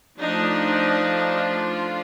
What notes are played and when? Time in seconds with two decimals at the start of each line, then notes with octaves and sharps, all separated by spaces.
0.20 F3 A3 D4 D#4
1.32 F4